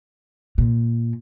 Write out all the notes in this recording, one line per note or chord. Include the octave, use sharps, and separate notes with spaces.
A#2